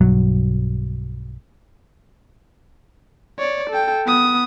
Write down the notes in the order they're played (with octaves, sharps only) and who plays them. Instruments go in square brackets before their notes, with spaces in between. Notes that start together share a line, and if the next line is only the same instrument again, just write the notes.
[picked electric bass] B1 G2 F#3
[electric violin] C#5 D5
A4 G5
B3 D#6